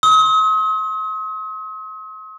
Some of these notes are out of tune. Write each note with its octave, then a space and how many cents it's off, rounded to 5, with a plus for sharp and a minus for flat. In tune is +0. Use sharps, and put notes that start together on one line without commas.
C6 +40 D#6 +45